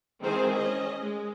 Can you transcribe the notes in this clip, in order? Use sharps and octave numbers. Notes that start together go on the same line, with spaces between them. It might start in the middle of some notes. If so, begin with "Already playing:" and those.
D#3 E3 G#3 C4 G#4 C5
C#4 D#5
G#3